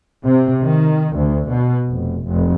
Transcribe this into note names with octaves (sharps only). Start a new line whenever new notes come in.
C3
D#3
D2
B2
F1
F1